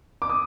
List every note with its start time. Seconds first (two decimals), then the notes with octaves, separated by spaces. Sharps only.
0.22 D6
0.30 D#6